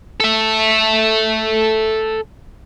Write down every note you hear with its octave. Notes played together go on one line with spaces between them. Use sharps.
A4 E5